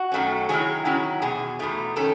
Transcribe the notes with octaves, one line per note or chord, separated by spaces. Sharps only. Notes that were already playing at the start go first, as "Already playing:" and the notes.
Already playing: F#4
F#2 D#3 F#3 A3 C#4
D#3 F#3 C#4 E4 G#4
D#3 F#3 C#4 E4
E2 B2 G#4
E2 B2 A3 D#4
D#3 A3 C#4 A4